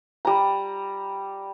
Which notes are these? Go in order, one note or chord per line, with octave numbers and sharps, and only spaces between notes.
G3 A#5